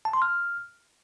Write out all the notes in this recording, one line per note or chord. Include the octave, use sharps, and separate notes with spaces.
A5
C6
F6